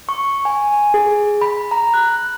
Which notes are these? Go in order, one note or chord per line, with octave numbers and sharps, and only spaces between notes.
C#6
G#5
G#4
B5
A#5
F#6